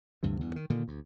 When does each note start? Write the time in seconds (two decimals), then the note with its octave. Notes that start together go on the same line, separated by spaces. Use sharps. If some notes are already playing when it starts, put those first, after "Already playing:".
0.23 D2 G2 C3 E3
0.41 E2 G2
0.56 D#3
0.70 A#2 D3 D#3
0.88 D2